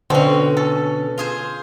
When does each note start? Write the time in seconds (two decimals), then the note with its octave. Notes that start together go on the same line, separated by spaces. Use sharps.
0.10 B2 D3 C4 C#4
0.57 A4
1.18 F4 G#4 C5